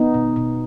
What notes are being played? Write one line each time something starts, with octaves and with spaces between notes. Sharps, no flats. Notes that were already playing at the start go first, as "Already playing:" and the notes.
Already playing: B3 D#4
B2
B2